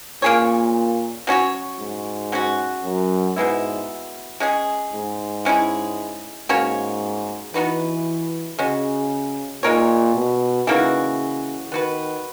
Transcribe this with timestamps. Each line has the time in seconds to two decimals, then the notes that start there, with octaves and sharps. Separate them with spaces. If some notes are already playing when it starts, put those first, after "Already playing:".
0.22 A#2 A#3 C#4 G#4 C#5
1.27 F#3 C#4 F#4 C#5
1.79 G#2
2.32 F#3 C#4 F#4
2.84 F#2
3.36 G#2 B2 G#3 B3 E4
4.40 G#3 C#4 G#4
4.93 G#2
5.45 G#3 C#4 E4 G#4
6.49 G#2 A#3 C#4 F#4 C#5
7.54 E3 B3 D#4 F#4 B4
8.59 C#3 G#3 C#4 F#4
9.63 A#2 G#3 D#4 A#4 C#5
10.15 B2
10.67 C#3 E3 A#3 D#4 F#4
11.72 D#3 B3 F#4 B4